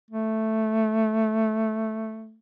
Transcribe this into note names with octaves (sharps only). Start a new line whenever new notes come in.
A3